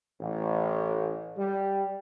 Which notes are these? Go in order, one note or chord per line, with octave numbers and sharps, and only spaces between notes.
A1
G3